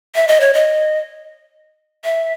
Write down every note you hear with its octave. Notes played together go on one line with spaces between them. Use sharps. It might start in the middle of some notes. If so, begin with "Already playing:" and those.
E5
D#5
C#5
D#5
E5